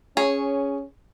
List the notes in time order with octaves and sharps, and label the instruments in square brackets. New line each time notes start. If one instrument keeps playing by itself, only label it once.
[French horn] C#4 [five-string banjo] G#4 C#5